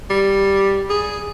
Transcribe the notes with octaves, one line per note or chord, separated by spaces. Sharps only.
G3
G#4